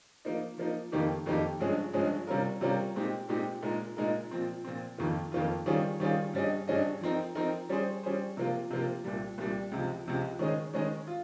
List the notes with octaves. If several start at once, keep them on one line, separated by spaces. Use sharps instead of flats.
F3 A#3 D#4
F3 A#3 D#4
F2 D#3 A#3 D#4 G4
F2 D#3 A#3 D#4 G4
G2 F3 G#3 C#4 G#4
G2 F3 G#3 C#4 G#4
C3 G3 C#4 F4 A#4
C3 G3 C#4 F4 A#4
A#2 G#3 C4 D#4 G4
A#2 G#3 C4 D#4 G4
A#2 G#3 D#4 A#4
A#2 G#3 D#4 A#4
A#2 F3 C4
A#2 F3 C4
F2 D#3 A#3 F4
F2 D#3 A#3 F4
D#3 G3 C#4 F4 G#4
D#3 G3 C#4 F4 G#4
G2 G3 C#4 G#4 D#5
G2 G3 C#4 G#4 D#5
F3 C4 D#4 A#4
F3 C4 D#4 A#4
G3 C#4 G#4 C5
G3 C#4 G#4 C5
C3 F3 A#3 F4
C3 F3 A#3 F4
C2 A#2 G3
C2 A#2 G3
C#2 C3 F3
C#2 C3 F3
D#3 G#3 C#4 G#4 D#5
D#3 G#3 C#4 G#4 D#5
F4